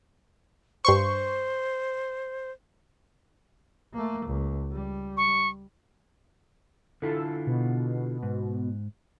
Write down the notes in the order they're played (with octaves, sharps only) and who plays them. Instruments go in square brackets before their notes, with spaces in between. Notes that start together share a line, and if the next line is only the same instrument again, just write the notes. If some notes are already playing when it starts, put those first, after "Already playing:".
[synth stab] G2 C6 C#6 [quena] C5
[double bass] A3 A#3
C#2
G3
[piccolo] C#6
[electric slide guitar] D3 E4 F4 [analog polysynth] A4
[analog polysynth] B2
[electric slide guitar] G#2